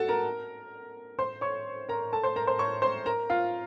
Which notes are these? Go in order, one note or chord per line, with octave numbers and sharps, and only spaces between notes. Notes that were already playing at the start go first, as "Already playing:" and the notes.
Already playing: F#4 A4 A5
A#4 A#5
C5 C6
C#5 C#6
A#4 A#5
A4 A5
C5 C6
A#4 A#5
C5 C6
C#5 C#6
C5 C6
A#4 A#5
F4 F5